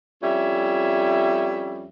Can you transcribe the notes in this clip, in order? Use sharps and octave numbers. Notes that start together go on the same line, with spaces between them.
F2 G3 C#4 E4 E5